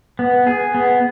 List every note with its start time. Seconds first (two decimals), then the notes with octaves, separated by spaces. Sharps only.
0.19 B3
0.47 G#4
0.75 B3